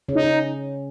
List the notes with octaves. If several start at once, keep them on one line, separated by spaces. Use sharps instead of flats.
C#3 C#4
D#4
C#3 C#4